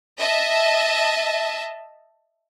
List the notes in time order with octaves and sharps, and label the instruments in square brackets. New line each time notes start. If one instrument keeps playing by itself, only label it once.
[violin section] D#5 E5 A5